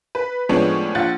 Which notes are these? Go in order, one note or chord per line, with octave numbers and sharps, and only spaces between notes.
B4
A2 F3 G#3 B3 C#4 D4
A#1 F4 F#5 F#6 A6